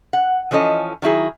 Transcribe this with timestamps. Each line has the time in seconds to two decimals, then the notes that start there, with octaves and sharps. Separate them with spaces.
0.13 F#5
0.51 E3 F3 C#4 A4 D#5
1.02 D#3 F#3 E4 G#4